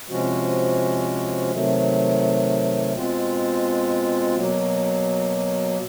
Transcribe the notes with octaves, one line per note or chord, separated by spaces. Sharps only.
C3 F3 G#3 C#4 F#4
C3 D#3 F#3 A3
B2 G#3 C4 F4
B2 F#3 A#3